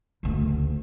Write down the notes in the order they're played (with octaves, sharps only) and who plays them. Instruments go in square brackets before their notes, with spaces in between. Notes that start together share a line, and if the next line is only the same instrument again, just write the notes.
[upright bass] F#1 D2